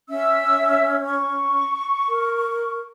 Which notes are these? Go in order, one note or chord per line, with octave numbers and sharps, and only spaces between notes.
C#4 E5 E6
C#6
A#4